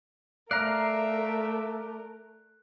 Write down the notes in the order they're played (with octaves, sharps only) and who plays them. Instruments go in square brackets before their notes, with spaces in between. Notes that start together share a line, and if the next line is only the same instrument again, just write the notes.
[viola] A3 A#4 [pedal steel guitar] D5 F5 A#5 [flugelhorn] E5 [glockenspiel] F#6